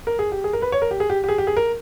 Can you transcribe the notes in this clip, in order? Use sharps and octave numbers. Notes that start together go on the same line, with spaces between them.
A#4
G#4
G4
G#4
A#4
B4
C#5
A#4
G4
G#4
G4
G4
G#4
G4
G#4
A#4